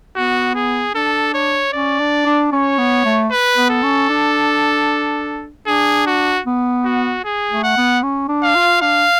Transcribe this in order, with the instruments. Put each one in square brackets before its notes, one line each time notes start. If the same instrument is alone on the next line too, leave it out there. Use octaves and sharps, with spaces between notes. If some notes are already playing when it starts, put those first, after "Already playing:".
[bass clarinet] B3 [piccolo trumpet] F#4
[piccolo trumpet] G#4
[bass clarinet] D4 [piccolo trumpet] A4
[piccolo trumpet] C#5
[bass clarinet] C#4 [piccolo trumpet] D5
[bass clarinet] D4
D4
[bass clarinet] C#4 [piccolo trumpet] C#5
[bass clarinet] B3
A3
[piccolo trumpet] B4
[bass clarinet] B3
[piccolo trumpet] A4
[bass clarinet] C#4
D4
[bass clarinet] D4 [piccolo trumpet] G#4
[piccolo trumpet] F#4
[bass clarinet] B3
[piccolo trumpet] F#4
G#4
[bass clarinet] A3
[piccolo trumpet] F#5
[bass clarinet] B3
C#4
D4
[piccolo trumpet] F5
[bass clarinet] F4
[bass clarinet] D4 [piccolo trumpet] F5